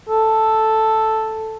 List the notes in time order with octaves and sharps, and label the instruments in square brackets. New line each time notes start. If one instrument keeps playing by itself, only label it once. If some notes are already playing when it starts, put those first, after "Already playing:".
[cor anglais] A4